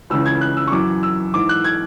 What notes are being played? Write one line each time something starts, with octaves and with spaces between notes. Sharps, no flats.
C#2 C#3 E3 E6
G#6
F#6
E6
C#6
F#2 E3 D6
E6
G#2 E3 D6
F#6
G#6